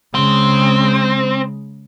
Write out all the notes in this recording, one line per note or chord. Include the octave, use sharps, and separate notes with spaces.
C#3 G#3 C4